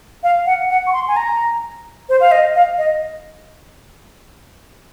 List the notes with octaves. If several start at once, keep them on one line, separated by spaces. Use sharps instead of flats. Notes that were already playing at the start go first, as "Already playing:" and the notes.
F5
F#5
F#5
C#6
C6
G#5
A#5
C5
F5
D#5
F5
D#5